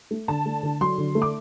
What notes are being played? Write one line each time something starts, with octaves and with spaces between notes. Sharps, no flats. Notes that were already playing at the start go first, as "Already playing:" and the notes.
A3
D3 A5
A3
D3
F#3 C6
D3
A3
D6